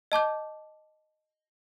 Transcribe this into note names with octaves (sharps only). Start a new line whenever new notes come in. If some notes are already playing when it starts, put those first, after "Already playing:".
D#5 A5 D6 G6